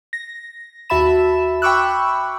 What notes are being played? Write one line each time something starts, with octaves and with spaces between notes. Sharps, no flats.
A#6
D#2 F#4 E5 A5 B5 E7
G5 B5 C#6 D6 E6 F#6